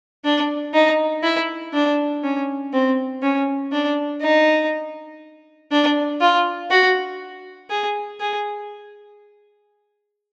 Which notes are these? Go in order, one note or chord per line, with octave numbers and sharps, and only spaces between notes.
D4
D#4
E4
D4
C#4
C4
C#4
D4
D#4
D4
F4
F#4
G#4
G#4